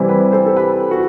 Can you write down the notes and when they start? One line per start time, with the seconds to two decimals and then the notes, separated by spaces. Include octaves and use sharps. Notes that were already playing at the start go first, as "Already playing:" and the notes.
Already playing: C3 E3 G3 C4 E4
0.08 G4 B4
0.32 A4 C5
0.46 A4
0.56 G4 B4
0.91 F#4 A4